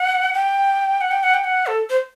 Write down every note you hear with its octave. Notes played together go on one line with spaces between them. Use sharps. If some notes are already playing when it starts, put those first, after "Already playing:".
Already playing: F#5
G5
F#5
G5
F#5
G5
F#5
A4
C5